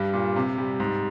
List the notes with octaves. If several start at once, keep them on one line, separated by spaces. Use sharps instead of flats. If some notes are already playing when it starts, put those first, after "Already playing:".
Already playing: G2 G3
A#2
C3
G3
G#2